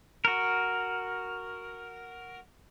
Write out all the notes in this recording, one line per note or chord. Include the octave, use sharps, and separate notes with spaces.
F#4 A#4